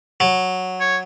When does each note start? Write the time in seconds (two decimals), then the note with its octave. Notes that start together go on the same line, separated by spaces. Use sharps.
0.20 F#3
0.80 C#5